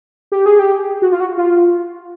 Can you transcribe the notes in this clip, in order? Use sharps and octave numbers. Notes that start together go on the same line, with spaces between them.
G4
G#4
G4
F#4
F4
F#4
F4